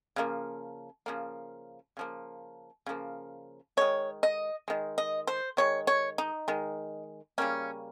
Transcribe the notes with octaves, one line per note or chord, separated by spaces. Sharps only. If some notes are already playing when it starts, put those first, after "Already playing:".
C#3 F3 A#3
C#3 F3 A#3
C#3 F3 A#3
C#3 F3 A#3
D#3 G#3 C#5
D#5
D#3 G#3
D#5
C5
D#3 G#3 C#5
C#5
D#4
D#3 G#3
C#3 G3 A#3 C#4